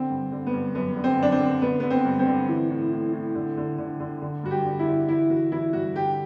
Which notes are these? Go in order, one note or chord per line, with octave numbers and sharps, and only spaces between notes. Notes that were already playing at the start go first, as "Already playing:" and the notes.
Already playing: D3 C4
G2
D3
B3
G2
F#2 B3
D3
C4
F#2 D4
C4
D3
D3 B3
D3 B3
C4
G2
C4
D3
E3
A2
A2
A2
D3
D3
D3
D3
D3
G2 F#4
G4
D3
E4
D3
E3 E4
E3 F#4
E3 E4
G2 F#4
D3 G4